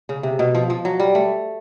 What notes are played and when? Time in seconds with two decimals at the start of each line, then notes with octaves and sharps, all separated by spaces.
0.09 C#3
0.23 C3
0.39 B2
0.55 F3
0.70 F3
0.85 F#3
1.00 G3
1.15 A3